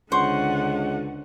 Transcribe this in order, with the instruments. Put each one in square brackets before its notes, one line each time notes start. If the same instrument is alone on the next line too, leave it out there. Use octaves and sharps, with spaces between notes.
[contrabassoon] C#2 [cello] D3 [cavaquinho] C5 C#6 [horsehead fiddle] F#5